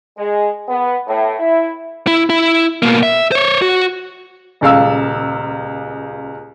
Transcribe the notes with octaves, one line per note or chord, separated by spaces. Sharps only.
G#3
B3
A2
E4
E4
E4
B2 A#3
E5
C5 C#5
F#4
D#1 C#2 F5 E6